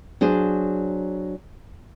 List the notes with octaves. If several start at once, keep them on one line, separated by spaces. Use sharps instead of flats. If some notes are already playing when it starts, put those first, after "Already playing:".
F#3 D4 G#4 C5